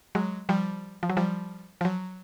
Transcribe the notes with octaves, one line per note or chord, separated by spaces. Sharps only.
F#3 G#3
F3 G3
F3
F#3
F3 G3
F3
F#3